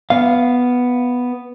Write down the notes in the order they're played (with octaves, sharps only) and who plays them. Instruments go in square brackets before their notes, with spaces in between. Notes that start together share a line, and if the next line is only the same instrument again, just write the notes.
[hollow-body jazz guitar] B3 F5